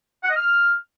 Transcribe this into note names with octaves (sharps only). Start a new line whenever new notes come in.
F#5
D#5
F6